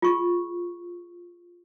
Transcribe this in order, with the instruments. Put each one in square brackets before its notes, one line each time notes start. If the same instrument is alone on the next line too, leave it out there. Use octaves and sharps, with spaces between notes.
[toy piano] F4 G#4 C#6